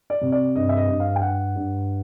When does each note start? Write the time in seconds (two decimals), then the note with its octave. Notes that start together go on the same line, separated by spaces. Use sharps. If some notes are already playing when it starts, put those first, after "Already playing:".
0.10 D5
0.21 C3
0.32 D5
0.55 G2 D#5
0.69 E5
0.77 D#5
0.88 G2
1.00 F5
1.15 G5
1.22 G2 F#5
1.55 G2